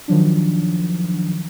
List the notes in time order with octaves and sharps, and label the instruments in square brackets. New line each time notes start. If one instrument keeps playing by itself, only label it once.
[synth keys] D#3 F3 F#3 D4